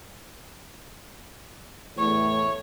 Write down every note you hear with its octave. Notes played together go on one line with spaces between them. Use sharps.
E2 A2 C#5